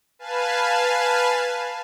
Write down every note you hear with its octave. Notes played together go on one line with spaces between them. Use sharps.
B4 F5 G#5 A5